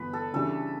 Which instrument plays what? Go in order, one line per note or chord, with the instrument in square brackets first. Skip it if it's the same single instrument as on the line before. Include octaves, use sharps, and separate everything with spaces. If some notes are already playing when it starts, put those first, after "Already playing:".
Already playing: [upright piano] G1 G2 E3 B3 [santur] B4
[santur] A4
[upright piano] C#3 E3 G3 D4 [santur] A4